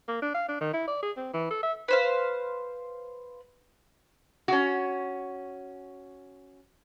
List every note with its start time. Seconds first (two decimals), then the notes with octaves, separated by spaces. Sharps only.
0.08 A#3
0.22 D4
0.34 F5
0.49 D4
0.61 D#3
0.73 E4
0.88 D5
1.03 G#4
1.17 C4
1.34 E3
1.50 A4
1.63 E5
1.88 B4 C5 F5
4.48 C#4 F#4